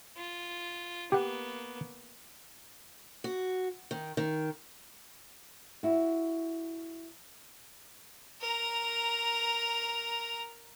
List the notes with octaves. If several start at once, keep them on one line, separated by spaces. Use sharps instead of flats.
F4
A#3 B3 G4 F#5
F#4
D#3
D#3
E4 F#4
A#4 A#5